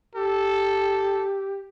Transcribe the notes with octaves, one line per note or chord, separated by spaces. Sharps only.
G4 A4